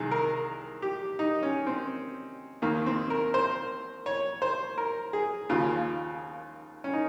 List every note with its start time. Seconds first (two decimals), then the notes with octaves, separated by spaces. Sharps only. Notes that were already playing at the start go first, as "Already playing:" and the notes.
Already playing: C2 C3 D#3 G#4
0.11 A#4
0.82 G4
1.19 D#4
1.43 C#4
1.67 C4
2.62 D#2 D#3 A#3
2.86 C4
3.10 A#4
3.34 C5
4.06 C#5
4.42 C5
4.78 A#4
5.13 G#4
5.49 D#2 C#3 F3 F4
6.84 C#4
6.93 D#4